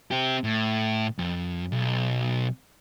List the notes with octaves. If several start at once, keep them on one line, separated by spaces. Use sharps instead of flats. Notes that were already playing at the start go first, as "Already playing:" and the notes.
C4 G4
A2
F2
B1